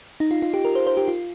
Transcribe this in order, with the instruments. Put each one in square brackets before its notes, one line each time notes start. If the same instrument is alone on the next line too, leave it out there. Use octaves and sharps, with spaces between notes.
[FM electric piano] D#4
F4
F4
G4
A#4
C5
C5
G4
F4